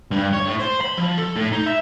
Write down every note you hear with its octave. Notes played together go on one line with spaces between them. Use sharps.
G2
C#5
A2
C5
B5
F3
A4
A2
D#4
E5